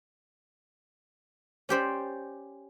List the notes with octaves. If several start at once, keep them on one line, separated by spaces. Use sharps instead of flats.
C#4 G4 C5 D5